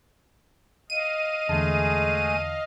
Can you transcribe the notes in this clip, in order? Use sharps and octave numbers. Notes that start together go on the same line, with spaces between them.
D#5 F5 D#7
E2 D3 G#3 A3 G#4 A5